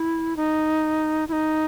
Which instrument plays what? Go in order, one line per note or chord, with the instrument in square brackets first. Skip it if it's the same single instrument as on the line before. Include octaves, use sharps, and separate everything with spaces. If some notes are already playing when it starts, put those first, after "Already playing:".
Already playing: [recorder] E4
D#4
E4
D#4